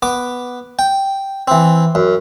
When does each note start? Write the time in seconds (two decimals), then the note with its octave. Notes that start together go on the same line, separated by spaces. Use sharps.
0.02 B3 D6
0.79 G5
1.48 E3 C4
1.95 F#2